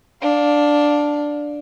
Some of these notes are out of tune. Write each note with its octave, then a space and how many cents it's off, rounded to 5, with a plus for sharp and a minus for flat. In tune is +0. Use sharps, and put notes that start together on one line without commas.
D4 +0 F5 +20